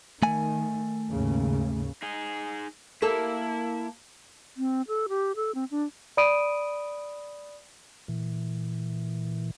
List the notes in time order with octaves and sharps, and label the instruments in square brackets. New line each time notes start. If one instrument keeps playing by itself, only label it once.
[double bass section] D#3 [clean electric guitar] A3 G#5
[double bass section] D#2 G#2 C#3
[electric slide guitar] D#4 G#4
[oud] A#3 A4 [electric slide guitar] E4
[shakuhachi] C4
A4
G4
A4
C4
D4
[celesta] D5 B5 D#6 D7 D#7
[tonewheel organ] A#2 E3